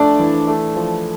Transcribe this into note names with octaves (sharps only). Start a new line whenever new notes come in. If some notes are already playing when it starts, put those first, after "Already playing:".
Already playing: F3 A3 D4 D5
E3
A3
F3